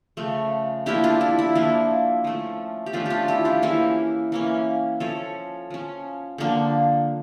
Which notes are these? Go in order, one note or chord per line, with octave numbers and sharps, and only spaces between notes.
C#3 F3 A3
F3 A#3 D4 E4 G4
D4 F4
E4
E4
F3 A#3 D4 E4
F3 A3 C#4
G4
F3 A3 C#4 D4 F4
D4 F4 G4
E4 G4
D4 F4
E3 A#3 C#4 E4
E3 A#3 C#4
F3 C#4 A4 C#5
F3 C#4
D3 F3 A#3 D4